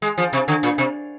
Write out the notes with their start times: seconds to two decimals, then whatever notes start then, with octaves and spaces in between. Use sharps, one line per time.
0.02 G#3
0.18 F3
0.33 C3
0.48 D3
0.63 A#2
0.78 C3